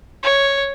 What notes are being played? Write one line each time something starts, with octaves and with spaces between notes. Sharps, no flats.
C#5